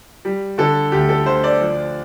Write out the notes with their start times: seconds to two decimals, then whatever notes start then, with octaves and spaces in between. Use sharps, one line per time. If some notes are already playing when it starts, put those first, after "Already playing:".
0.25 G3
0.58 D3 A4
0.92 D2 G4
1.09 A4
1.26 D2 C5
1.44 D5
1.61 F3